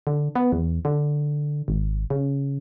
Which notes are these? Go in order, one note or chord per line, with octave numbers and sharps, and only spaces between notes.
D3
B3
E2
D3
G#1
C#3